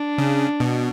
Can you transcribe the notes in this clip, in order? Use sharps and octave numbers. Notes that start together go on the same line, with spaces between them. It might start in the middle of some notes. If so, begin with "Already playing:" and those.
Already playing: D4
C#3
B2